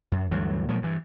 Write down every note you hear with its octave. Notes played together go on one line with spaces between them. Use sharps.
F#2
D2 G2 E3 F#3
A#2 F3 F#3 G#3
G2 E3